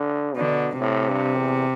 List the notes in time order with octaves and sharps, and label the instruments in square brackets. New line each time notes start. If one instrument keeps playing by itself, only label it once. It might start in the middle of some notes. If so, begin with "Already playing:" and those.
Already playing: [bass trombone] D3
[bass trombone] B2 [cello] D3
[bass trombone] A2 [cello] C3
[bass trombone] G2
E2